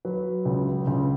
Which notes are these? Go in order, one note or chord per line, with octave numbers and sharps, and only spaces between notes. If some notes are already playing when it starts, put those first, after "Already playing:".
F#3 B4
C#2
C#2